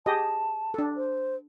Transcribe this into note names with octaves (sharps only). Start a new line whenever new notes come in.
G4 G#4 D#5 A5
D4 A4
C5